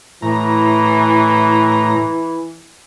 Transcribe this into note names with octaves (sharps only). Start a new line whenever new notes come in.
A2 E3 A#5